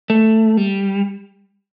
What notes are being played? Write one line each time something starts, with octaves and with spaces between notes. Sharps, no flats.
A3
G3